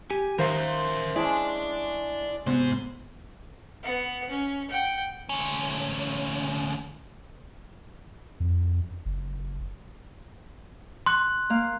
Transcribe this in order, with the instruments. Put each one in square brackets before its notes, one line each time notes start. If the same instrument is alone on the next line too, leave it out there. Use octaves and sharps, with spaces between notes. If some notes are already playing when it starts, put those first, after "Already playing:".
[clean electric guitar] G4 [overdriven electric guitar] G#5
[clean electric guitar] D#3 F5 A#5 [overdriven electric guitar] A#4 E5 [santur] C5
[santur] G#3 C#4 [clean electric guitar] E4 [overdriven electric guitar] D5 A5
[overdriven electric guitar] G#2 C5 [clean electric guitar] C3 B3
[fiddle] B3 F#5
C#4
F#5 G5
[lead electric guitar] D2 C#4
[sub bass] F2
F#1
[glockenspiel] C6 F#6
[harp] A#3 F5